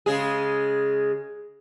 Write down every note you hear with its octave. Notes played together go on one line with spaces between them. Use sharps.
C#3 G#3 G#4